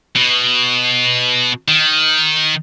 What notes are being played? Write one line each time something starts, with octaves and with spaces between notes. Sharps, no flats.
B2
D#3